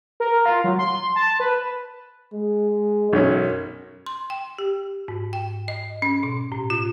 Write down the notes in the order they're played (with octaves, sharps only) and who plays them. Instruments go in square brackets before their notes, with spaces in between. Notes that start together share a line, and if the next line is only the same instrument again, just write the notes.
[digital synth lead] A#4
F4
F#3
C6
A5
B4
[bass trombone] G#3
[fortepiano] B1 C#4 [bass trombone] F#2
[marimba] C6
G5
G4
G#2
G5
D#5
C#4
B2
A2
F4